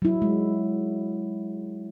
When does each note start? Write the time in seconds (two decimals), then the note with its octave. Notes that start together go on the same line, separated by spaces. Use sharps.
0.02 F#3 E4
0.22 G#3